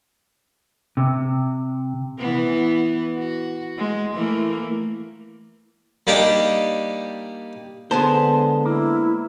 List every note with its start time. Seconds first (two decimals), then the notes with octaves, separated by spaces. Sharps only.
0.97 C3
2.19 E3 B3
3.18 F#4
3.78 G#3
4.15 E3 A3 A#3
6.07 G3 A#3 D4 D#4 G4
7.91 D3 G#3 B3 C5 A5
8.65 A#3 E4